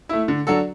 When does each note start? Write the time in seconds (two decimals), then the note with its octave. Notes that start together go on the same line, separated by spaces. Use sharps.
0.09 A3 E4
0.28 D3
0.47 F#3 D4 F#4 A4